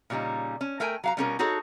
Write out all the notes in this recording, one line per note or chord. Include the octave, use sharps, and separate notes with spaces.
A#2 C#3 G3 C#4 D#4
C#4
A3 A#4 G5 G#5
F#3 F5 A#5
B2 G3 C#4 F4 A4 A#4
D#4 F#4 G#4 A4 C#5